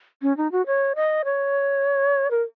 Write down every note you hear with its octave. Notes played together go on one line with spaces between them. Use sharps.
C#4
D#4
F#4
C#5
D#5
C#5
A#4